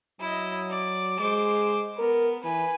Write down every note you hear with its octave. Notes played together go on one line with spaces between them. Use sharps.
F#3 E4 D#5
D5
G#3 C5 D6
B3 A#4
E3 B4 G#5